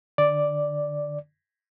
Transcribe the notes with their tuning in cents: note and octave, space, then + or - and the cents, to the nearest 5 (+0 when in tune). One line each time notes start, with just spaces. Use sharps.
D3 +20 D5 +0